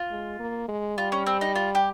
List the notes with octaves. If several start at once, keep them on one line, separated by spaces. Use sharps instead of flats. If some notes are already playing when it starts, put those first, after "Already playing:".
Already playing: F4
G#3
A#3
G#3
G3 F4
C#4
C4
D#4
F4
G4